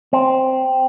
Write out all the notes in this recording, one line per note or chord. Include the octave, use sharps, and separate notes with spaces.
C4